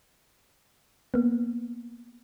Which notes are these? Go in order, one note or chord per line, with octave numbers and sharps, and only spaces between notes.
A#3 B3